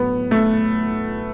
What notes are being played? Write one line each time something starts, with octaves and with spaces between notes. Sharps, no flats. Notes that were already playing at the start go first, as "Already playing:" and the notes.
Already playing: A2 F#3 B3
A3